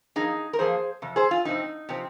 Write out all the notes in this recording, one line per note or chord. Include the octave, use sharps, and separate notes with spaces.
F2 F3 A#3 D#4 G#4
A#4
F2 F3 A#3 G#4 C5
F2 C3
G#4 C5
F4
F2 C3 C4 D#4
C3 F3 C4